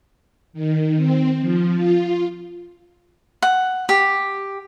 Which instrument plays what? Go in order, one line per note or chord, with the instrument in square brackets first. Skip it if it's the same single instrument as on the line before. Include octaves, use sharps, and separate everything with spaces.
[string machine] D#3
C4
F3
F4
[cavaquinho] F#5
G4